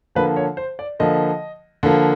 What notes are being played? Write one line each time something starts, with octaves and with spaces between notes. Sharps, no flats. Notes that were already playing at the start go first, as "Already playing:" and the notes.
D3 F3 A#3 B4
C#5
C5
D5
D3 F3 A#3 D#5
D3 F3 A#3